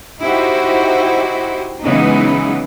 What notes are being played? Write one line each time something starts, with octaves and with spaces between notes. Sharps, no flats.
D#4 E4 F#4 G4 C5
C#3 E3 F#3 G#3 B3 D#4